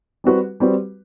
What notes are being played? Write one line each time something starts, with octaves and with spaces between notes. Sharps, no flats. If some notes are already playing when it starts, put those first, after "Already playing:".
G3 C4 F#4 B4
G3 C4 F#4 B4